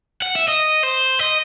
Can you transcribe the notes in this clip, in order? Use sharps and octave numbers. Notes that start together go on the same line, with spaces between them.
F#5
E5
D#5
C5
D#5